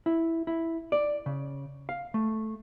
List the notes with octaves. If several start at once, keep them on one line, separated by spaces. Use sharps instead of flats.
E4
E4
D5
C#3
F5
A3